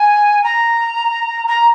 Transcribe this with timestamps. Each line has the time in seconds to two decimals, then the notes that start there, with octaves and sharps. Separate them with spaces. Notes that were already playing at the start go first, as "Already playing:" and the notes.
Already playing: G#5
0.44 A#5
1.48 A#5